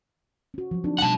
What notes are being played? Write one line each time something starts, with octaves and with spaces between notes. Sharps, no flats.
C#4 F#4
F3 F#3
C4 D4 D#4
B2 G3 A3 F#5 A5